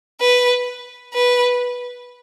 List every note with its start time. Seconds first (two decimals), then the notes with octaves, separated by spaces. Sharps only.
0.21 B4
1.14 B4